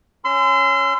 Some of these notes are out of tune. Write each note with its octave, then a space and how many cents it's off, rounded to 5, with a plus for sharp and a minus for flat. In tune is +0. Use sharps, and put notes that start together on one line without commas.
C#4 +0 C6 -30 E6 +25